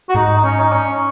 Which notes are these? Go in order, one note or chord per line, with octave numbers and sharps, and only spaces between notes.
F#4
G#2 D#4
D#4
C#4
D#4
C#4